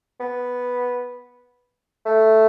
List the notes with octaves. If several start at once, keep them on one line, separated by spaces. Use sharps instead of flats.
B3
A3